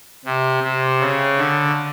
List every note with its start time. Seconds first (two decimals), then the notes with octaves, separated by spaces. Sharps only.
0.25 C3
0.63 C3
1.01 C#3
1.38 D3